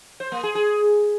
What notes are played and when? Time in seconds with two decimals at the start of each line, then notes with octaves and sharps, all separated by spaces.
0.20 C5
0.32 A#3
0.43 G#4
0.55 G#4